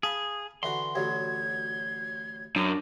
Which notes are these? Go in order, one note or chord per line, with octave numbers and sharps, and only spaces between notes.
G#4 F5 A5 B5
D3 E3 F#4 C6
A1 D2 F#3 G#6
F#2 D4 A#4